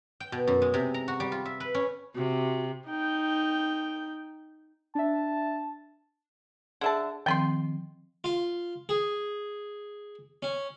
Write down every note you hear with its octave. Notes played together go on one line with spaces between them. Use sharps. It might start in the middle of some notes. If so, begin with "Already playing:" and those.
G5
B2
F#2
G#3
C3
A#5
F#4
G3
F4
E5
B4
C#4
C3 F#4
D#4 G5
D4 E5 A5
D3 G#4 E5 A5
D#3 F3 C4 G5 B5 C6
F4
G#4
C#4